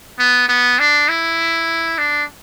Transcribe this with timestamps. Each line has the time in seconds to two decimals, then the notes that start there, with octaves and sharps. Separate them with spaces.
0.19 B3
0.49 B3
0.79 D4
1.09 E4
1.98 D4